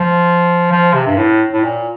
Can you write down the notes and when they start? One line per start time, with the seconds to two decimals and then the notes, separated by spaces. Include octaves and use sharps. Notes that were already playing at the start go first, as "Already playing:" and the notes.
Already playing: F3
0.71 F3
0.94 C3
1.07 G2
1.17 A2
1.53 A2
1.64 A#2